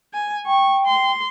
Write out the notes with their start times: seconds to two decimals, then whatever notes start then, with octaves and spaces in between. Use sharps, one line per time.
0.13 G#5
0.46 G5 C#6
0.86 C6